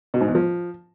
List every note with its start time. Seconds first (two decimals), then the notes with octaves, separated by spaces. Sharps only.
0.14 B2
0.21 G#2
0.28 E2
0.35 F3